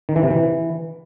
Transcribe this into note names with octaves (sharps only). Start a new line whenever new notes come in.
D#3
E3
C3
E3